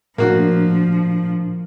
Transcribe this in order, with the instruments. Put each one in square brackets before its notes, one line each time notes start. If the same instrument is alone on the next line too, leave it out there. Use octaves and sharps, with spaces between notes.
[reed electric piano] A2 D4 [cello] F3 [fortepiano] A#3 F#4